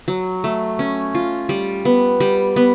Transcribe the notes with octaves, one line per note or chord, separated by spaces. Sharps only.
F#3
A3
C#4
F4
G3
B3
G3
B3